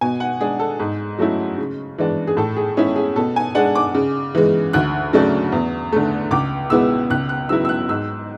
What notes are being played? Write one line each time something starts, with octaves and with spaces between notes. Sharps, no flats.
B2 G#5
F#5
G#3 D4 G#4
A4
G#2 G#4
F#3 A3 C#4 E4
C#3
E3 G#3 D4
G#4
A2 A4
G#4
G#3 C#4 E4 G#4
G#4
B2 A4
G#5
G#3 D4 F#5
D6
C#3
E3 G#3
D2 F#6
C#3 F#3 A3 D4
E2
D3 A3
C#2 D6
B2 G#3 B3 E4 E6
C#2 F#6
F#6
C#3 F#3 B3 E4 E6
E6
F#6
G#2 E6